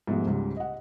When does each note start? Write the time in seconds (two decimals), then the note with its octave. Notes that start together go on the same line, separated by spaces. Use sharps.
0.07 G#2 B2 F3 G3 A3
0.27 C#2 G#2 G3
0.56 D#5 F#5